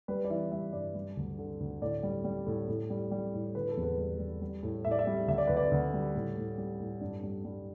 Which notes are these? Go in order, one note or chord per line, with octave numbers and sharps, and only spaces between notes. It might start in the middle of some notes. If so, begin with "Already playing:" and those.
G3 B4
D5
E3 E5
G3 E5
G2 D5
G3
D2
D3
D2
A2 D5
G3
G3
A2
A2
G3
G3
A2
D3 B4
A4
E2
B4
G3
G3
G3
A2
A2 E5
D5
E5
G3
D2 E5
D5
D2 B4
D5
D2
G3
A2
A2
G3
A2
G2 D4
G3
G3